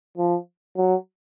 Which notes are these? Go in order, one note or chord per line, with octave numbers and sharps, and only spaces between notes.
F3
F#3